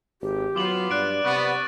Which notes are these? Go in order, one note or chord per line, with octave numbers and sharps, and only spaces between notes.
G#1 G4
F#3 B3 F4 D6 F#7
G2 D5 F#6 D7
C3 B3 C#6 F#6 A6